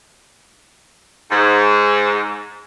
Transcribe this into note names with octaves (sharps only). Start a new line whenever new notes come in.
G#2